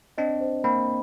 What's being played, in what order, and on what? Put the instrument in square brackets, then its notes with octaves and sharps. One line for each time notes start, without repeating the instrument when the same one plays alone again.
[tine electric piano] C4 D4 [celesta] D#5
[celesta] C5
[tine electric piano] A#3 C4 [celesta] B5